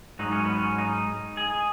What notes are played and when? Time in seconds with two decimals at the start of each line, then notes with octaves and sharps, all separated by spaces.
0.19 G#2 F#3 D#4
0.32 C#4
0.45 B3
0.58 C#4
0.78 D#4
1.37 G#4